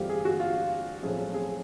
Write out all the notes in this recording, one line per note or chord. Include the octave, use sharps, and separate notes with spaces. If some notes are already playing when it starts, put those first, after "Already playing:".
Already playing: G1 G2 E3 A3 C4 F4 G4
G#4
F#4
F4
B1 A2 F3 A3 C4 G#4
G#4